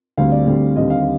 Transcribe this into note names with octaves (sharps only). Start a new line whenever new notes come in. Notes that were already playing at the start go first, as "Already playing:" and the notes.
D2 D3 G3 C4 F5
D5
D2 D3 G3 C4
D#2 D3 G3 C4 D#5
F5